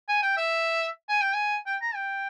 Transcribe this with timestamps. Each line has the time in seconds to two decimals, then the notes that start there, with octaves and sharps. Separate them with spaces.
0.08 G#5
0.22 G5
0.37 E5
1.09 G#5
1.21 G5
1.34 G#5
1.66 G5
1.82 A#5
1.95 G5